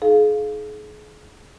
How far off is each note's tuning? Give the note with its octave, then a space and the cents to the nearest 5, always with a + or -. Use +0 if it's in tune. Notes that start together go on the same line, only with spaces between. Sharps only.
D#4 +20 G#4 +35 F5 +0